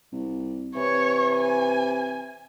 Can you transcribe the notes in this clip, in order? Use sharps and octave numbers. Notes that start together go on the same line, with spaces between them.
C2
C3 E3 C#5
G#5